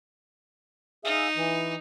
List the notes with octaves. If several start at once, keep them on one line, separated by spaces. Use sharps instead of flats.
D#4 G#4 E5 F5
E3